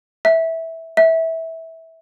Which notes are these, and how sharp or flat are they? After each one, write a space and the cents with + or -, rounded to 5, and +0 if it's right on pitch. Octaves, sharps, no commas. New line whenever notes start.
E5 -15
E5 -20